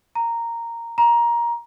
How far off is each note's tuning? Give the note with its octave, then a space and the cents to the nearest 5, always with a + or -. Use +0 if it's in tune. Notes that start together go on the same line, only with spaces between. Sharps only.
A#5 -5
A#5 +15